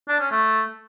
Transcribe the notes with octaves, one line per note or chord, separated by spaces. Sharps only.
D4
C#4
A3